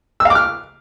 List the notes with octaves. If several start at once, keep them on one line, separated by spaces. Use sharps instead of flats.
E6
F5
D6
F6